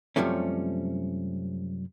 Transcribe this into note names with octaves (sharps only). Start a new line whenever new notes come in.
F#2 C3 F3 G3 A3 C#4